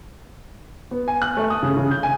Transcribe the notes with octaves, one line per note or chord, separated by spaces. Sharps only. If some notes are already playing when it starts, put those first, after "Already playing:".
B3
G#5
F#6
A3
D#6
C#3
C#3
G6
G#5